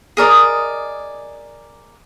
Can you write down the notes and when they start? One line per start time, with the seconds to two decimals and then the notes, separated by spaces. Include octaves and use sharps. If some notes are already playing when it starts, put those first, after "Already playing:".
0.17 G#4 A#4 D5 D#5